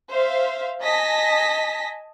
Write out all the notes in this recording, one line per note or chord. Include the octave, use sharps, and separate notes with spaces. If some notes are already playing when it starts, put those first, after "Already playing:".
C5 E5 F5
D#5 G#5 A5 A#6 B6